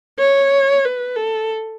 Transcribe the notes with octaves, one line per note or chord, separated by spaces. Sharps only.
C#5
B4
A4